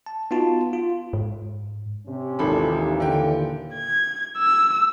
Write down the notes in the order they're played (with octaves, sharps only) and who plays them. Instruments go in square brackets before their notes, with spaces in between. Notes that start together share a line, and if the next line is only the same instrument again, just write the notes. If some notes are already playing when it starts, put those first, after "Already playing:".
[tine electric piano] A5
B3 D#4 F4 F#4 A5
F4
[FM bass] G#2
[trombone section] C3 C#4
[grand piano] G#1 A4 B5 [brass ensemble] D#2 A#2 E3
[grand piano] D3 G5
[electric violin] G#6
E6